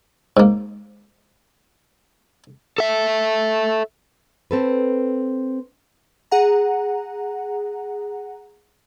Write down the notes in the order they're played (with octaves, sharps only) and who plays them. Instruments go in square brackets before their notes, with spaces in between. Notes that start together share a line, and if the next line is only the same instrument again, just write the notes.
[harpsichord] G#2 A#3
[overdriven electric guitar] A4 E5
[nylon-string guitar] C4 A4 B4
[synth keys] G#4 F#5 A#5